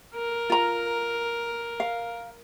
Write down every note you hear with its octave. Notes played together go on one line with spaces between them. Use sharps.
A#4
F4 A#5
F5